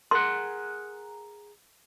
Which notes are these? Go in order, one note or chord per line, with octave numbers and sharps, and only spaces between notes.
G#4 A#4 F#5 C6